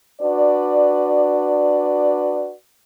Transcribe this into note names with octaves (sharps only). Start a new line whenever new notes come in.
D4 F#4 B4 D5